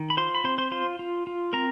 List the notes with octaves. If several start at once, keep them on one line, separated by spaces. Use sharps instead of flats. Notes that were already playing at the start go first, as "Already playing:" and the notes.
Already playing: D#3
B5
F4 C5 C6
B5
C4 C5 C6
C5 C6
F4 C5 C6
F4
F4
C4 A#4 A#5